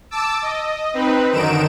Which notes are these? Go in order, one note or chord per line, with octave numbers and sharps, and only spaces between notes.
A5 D6 E6
D#5
C4 D#4 B4
F#2 D3 D#3 D#4 D7 E7